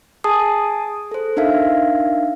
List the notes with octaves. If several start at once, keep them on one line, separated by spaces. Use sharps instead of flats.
G#4 G#5 A5 D#6 C7
A4 C5
D4 D#4 A#4 E5 F5